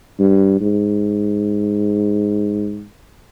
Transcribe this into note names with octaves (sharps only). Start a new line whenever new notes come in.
G2
G#2